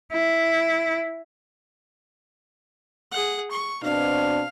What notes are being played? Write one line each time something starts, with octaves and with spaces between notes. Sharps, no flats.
E4
G#4 F#5
C#6
B2 C4 D4 F5